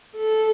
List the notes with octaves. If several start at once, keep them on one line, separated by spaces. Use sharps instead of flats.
A4